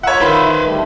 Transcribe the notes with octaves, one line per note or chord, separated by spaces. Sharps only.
F4 C#5 E5 F#5
D#3 B4 C5 B5
D2 G3 A3